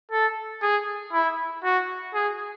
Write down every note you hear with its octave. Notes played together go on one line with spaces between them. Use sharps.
A4
G#4
E4
F#4
G#4